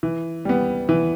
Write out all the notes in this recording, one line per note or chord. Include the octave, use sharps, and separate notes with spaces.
E3
G3 B3
E3